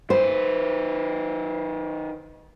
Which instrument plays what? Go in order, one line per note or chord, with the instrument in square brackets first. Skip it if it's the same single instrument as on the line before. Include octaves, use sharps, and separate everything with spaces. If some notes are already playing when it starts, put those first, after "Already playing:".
[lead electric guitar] D#3 B4 [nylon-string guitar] C5